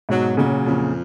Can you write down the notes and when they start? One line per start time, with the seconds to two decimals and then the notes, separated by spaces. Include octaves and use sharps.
0.09 G#2 B2 F#3
0.37 A#2 C#3 F#3
0.66 F2 A#2 C#3